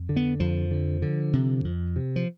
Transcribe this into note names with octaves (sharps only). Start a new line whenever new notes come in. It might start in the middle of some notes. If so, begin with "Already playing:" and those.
Already playing: F2
D3
B3
F2 F3
D3
D3
C3
F2
C3
F3